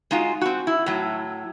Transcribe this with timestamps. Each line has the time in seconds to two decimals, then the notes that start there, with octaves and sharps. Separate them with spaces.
0.11 G#3 D#4 F4 F#4
0.41 C4 F#4
0.67 E4
0.86 A2 F#3